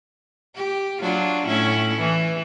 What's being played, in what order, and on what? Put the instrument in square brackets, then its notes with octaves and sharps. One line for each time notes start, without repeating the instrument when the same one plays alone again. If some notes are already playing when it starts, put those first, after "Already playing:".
[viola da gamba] G4
F#3 D4 F4
A2 C#4 E4
E3